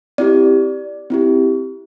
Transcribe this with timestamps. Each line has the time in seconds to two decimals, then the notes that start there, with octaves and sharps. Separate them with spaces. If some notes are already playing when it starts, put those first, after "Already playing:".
0.18 C4 E4 G4 D5
1.10 C4 E4 G4